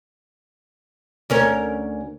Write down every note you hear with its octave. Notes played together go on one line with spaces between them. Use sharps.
D2 C#4 A#4